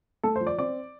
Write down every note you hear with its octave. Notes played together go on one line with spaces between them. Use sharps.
A3 A4
F3 C5
D5
C4 D5